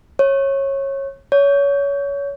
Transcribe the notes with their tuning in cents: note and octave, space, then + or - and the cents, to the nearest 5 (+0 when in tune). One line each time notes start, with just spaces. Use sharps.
C#5 -20
C#5 +25